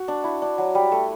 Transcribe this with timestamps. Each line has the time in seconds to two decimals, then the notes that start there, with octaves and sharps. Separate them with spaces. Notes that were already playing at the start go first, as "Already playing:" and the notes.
Already playing: F#4
0.08 D4
0.24 E4
0.42 D4
0.58 F#3
0.75 G3
0.92 A3